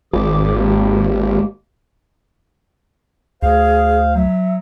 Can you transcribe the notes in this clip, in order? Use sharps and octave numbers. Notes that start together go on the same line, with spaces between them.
G#1 D#3 G#4 D6
G#3 A#3 G4
D2 G#4 C5 F5
F#3 E5